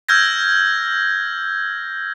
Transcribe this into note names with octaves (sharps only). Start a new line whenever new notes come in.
E6 F6 G6 G#6 A#6